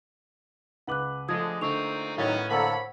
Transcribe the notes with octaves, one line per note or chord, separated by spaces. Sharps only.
C#2 B4 F#5 D6 F#6 F#7
D3 F3 G#3 A3 D#6 G#6
A#2 D3 A3 C4 D#4 D#5 C#6 F7
A2 D#3 F#3 B3 C#4 F5 A6
D3 A#3 A4 A#4 C5 C#5 F#5 B5